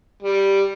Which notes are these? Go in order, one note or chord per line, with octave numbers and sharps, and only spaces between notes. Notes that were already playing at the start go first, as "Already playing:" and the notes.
G3